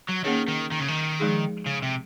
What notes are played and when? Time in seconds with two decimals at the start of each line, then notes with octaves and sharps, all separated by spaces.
0.09 F#3
0.24 D#3 A#3 C#4 G#4 C#5
0.48 D#3
0.71 D#3
0.80 C#3
0.88 D#3
1.20 F3 G#3 D#4 G#4
1.67 C#3
1.83 C3